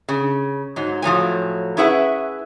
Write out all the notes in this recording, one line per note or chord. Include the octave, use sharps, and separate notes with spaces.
C#3
G#2 F#3
A2 F3 F#3 G#5
C#4 E4 G#4 B4 E5 F#5